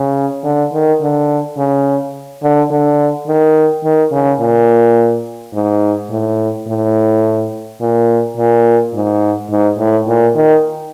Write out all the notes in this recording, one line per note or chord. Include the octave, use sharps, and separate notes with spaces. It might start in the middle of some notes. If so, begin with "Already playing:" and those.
Already playing: C#3
D3
D#3
D3
C#3
D3
D3
D#3
D#3
C#3
A#2
G#2
A2
A2
A#2
A#2
G#2
G#2
A2
A#2
D#3